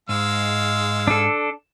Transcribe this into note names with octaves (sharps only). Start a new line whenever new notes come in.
G#2 G#3 F5 E6
D4 A4